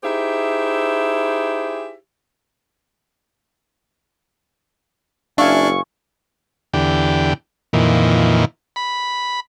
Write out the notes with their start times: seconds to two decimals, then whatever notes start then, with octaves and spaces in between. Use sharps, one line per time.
0.04 D#4 E4 G4 G#4 C5 E5
5.38 F#1 D4 E5 F5 G#5 C#6
6.73 E2 D3 G4
7.73 F2 A#2 D#3 E3
8.76 B5